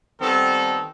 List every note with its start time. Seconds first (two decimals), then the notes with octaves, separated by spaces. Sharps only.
0.21 D#3 G3 B3 C4 A4